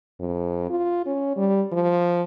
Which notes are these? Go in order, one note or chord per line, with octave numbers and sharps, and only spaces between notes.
F2
F4
C#4
G3
F3